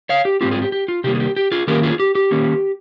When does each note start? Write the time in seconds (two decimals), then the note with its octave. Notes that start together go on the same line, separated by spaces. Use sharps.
0.09 C#5 F5
0.25 G4
0.41 G#2 F3 C4 F4 G4
0.51 F4 G#4
0.62 G4
0.72 G4
0.88 F4
1.04 C3 D#3 G3 A#3 G4
1.15 G#4
1.20 G4
1.36 G4
1.52 F4 G#4
1.68 D#3 A#3 C#4 G4 A#4
1.83 F4 G#4
2.00 G4
2.15 G4
2.31 D#3 A#3 C#4